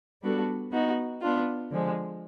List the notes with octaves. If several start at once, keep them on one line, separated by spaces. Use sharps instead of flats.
G3 B3 D4 F#4 A4
B3 D#4 F#4
B3 D4 F4
D3 F3 G#3